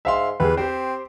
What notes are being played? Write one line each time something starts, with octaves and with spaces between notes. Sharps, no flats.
G#2 E5 F5 C6
E2 G4 G#4 B4
C4 G4 C5